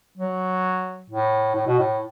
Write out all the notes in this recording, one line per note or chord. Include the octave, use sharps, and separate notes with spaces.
F#3
A2
A2
B2
A2